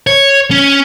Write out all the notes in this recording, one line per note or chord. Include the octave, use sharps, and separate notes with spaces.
C#5
C#4